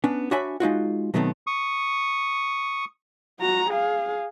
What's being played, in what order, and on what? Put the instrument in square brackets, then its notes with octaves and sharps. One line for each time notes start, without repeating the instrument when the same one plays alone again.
[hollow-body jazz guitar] B3 C#4 D4
D4 F#4 C#5 E5 G#5 B5
G#3 D#4 F4 F#4
B2 D#3 F#3 A3 B3 C4
[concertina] C#6 D#6
[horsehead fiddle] F#4 A#5
G#4 F5